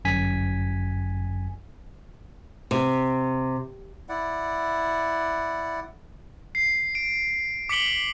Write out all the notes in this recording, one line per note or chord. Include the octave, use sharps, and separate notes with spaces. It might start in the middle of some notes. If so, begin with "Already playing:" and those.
G1 F#2 G#5 B6
C3
E4 D5 F#5
C7
D7
D6 B6 C#7 D7 F#7 G7